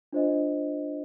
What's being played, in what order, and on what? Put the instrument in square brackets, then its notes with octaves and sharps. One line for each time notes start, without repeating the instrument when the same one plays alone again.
[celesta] D4 F4 C5 D#5